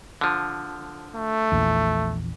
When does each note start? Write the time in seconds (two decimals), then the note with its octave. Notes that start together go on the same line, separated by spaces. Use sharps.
0.21 D3 F3
1.15 A3
1.52 A#1 E2